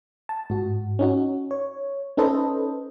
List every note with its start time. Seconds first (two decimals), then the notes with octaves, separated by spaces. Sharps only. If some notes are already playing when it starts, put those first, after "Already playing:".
0.29 A5
0.50 G#2 F#4
0.99 C#4 D#4 F#4
1.51 C#5
2.17 C#4 D#4 A4 B4 C5 D#5